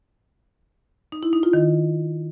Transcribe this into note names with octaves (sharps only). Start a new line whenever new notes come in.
D#4
E4
D#4
F4
D#3